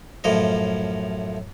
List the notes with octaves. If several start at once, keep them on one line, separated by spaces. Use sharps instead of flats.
F#2 A2 F3 D#5